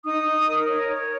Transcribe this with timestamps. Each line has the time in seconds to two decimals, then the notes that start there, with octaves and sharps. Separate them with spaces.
0.04 D#4 D#6
0.25 D#4
0.47 A#4
0.67 C#5
0.88 C#5